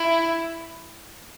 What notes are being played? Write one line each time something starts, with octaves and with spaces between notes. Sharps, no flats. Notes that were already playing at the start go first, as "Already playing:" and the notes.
Already playing: E4